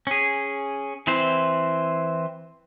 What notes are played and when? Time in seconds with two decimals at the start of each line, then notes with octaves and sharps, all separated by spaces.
0.07 C#4 G#4
1.07 E3 C4 E4 C5